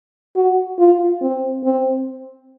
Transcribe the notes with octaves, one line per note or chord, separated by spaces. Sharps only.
F#4
F4
C4
C4